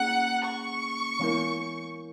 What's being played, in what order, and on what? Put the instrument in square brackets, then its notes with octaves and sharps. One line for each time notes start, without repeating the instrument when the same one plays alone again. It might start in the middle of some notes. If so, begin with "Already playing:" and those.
Already playing: [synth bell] A#3 C#4 G#4 [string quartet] F#5
[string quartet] C#6
[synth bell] E3 G#3 B3 E4 A#4